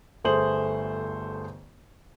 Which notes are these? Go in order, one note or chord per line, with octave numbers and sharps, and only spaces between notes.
G1 A3 G#4 C5 F#7